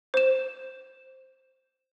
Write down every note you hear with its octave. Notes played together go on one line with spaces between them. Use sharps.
C5 E7